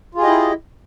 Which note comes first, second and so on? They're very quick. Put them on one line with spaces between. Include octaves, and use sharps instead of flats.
F4 G#4 G4 D#5 E4